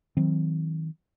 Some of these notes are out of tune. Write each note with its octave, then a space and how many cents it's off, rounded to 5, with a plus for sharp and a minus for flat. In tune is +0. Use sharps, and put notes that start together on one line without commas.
D#3 +40 F#3 +0 C4 +0